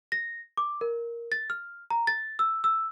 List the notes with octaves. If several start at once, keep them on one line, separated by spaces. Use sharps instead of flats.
A#6
D6
A#4
A6
F6
A#5
A6
E6
E6